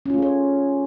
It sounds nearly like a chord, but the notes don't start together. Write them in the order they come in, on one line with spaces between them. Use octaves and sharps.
C#4 F4 A3 G#4 C#5